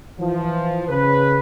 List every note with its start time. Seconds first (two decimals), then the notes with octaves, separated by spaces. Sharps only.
0.18 E3 F3
0.88 C#3 B4